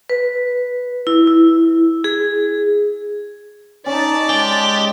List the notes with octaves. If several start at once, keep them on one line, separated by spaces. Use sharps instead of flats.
B4
E4
E4
G#4
C#4 D#4 D5 A5
G#3 G4 G#5